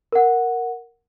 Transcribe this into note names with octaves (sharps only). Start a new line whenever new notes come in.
A#4 F#5